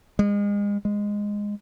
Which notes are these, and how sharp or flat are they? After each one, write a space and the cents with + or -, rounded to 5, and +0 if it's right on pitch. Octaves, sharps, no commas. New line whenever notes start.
G#3 -35
G#3 -10